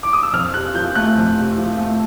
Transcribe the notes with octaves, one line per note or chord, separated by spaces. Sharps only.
D6
D#6
E6
F2 F6
C3 F#6
F3 G6
A3 F#6
F2
C3
F3
A3